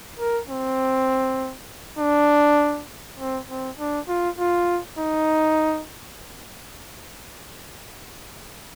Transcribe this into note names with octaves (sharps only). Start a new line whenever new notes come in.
A#4
C4
D4
C4
C4
D4
F4
F4
D#4